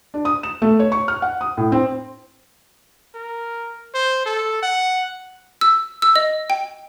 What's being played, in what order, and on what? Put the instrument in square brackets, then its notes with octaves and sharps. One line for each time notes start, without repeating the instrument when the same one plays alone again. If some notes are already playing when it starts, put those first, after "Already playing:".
[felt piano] D4
D#6
E7
A3
C#5
C#6
F6
F#5
D#6
A2
C4
[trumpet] A#4
C5
A4
F#5
[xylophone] E6
E6
D#5
G5